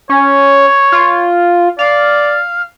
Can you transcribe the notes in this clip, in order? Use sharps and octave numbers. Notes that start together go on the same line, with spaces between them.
C#4 C#5
F4
D5 F5